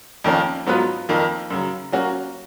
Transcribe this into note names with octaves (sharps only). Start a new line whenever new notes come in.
F2 D#3 A#3 C#4
G#2 F#3 B3 F4 B4
F2 D#3 A#3
F#2 C#3 F#3
F#3 A#3 C#4 F#4